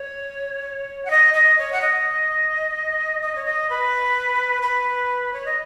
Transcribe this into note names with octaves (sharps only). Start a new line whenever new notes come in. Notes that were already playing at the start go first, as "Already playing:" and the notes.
Already playing: C#5
F#5
D#5
D#5
C#5
F#5
D#5
D#5
C#5
D#5
B4
B4
C#5
D#5